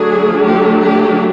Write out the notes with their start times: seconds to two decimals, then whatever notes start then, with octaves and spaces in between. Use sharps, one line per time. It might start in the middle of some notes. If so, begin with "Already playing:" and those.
Already playing: D3 F#3 A3 D4 G#4
0.43 G4
0.80 G4